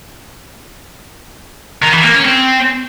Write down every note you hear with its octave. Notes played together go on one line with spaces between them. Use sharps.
D#3
E3
A#3
C#4
C4